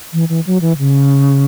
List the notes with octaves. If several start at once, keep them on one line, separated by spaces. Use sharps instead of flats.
E3
E3
F#3
E3
C#3